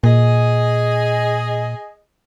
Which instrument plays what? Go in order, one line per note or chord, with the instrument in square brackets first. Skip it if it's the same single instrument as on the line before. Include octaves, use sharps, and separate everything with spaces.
[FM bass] A#2 [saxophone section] G#4 D#5